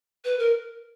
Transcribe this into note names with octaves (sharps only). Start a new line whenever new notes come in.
B4
A#4